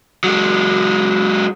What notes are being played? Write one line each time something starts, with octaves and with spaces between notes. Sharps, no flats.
F#3 G#3